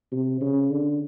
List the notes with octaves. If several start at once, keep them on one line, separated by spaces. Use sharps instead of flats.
C3
C#3
D3